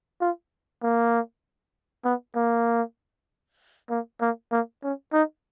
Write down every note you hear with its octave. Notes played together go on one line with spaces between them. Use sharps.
F4
A#3
B3
A#3
A#3
A#3
A#3
C#4
D#4